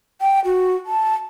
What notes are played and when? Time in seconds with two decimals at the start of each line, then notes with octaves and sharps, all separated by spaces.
0.21 G5
0.45 F#4
0.86 A5